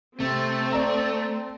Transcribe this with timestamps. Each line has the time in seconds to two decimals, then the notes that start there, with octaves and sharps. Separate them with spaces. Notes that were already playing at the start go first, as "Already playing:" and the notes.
0.20 C3 A3 C4
0.72 D5 A#5